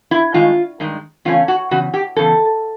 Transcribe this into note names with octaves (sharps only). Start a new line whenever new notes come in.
E4
G2 D#3 G#3 F4
G2 D#3 G#3
E2 C#3 A3 C#4 F4
F#4
E2 C#3 F#4
G4
E2 C#3 A4